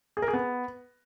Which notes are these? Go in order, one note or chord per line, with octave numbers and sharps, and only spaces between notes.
G#4
A#4
G#4
B3